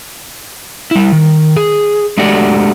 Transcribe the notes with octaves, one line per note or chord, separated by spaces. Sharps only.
G3 E4
D#3
G#4
G#3 A3 D4 F#4 G4 D5